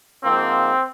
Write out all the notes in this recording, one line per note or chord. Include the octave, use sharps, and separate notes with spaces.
G#2 F3 A#3 C4